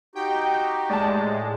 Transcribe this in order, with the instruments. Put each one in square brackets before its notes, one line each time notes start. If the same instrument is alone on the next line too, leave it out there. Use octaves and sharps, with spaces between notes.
[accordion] D#4 F#4 G4 [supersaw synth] G5
[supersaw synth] A2 G#3 [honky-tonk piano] D5 A5